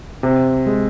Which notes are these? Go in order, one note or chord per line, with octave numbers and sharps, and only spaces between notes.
C3
G#3